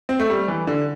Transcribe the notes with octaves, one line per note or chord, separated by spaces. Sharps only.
C4
A3
G3
E3
D3